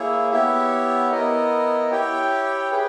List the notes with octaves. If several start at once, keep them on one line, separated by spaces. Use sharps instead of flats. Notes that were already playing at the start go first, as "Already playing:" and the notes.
Already playing: A#3 E4 G#4 C#5 E5
B3 E4 G4 C#5 E5
B3 E4 A#4 D#5
E4 G4 C#5 G5
G#4 B4 G5